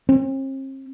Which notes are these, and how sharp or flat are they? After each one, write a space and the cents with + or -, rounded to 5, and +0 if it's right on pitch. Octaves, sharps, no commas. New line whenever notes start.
C4 +45